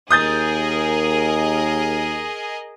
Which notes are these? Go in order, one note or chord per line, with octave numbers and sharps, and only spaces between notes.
D#2 G#4 A#4 D#5 D#6 G6 A6